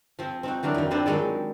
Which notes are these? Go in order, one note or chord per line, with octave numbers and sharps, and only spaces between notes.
F3 C4
C4 D#4 F#4
E3 F#3 D4 A#4
F2 D#3
B3 C4 D4 A4 B4 C5
D#3 F#3 G#3 A4 D5